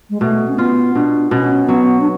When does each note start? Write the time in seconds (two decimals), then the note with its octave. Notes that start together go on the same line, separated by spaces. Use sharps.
0.10 G#3
0.21 B2 A3
0.48 C#4
0.58 B3 F4
0.95 B2 D4
1.31 B2 C#4
1.68 F#3 B3
2.01 D4